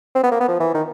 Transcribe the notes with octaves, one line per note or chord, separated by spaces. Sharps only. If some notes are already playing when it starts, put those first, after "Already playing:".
C4
B3
A#3
B3
F3
E3
D#3